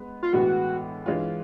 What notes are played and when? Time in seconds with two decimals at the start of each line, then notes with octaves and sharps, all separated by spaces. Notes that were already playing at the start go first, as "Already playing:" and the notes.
Already playing: G#3 B3 B4
0.23 F4
0.33 A2 E3 G#3 B3 F#4
1.06 E3 G#3 C#4 F4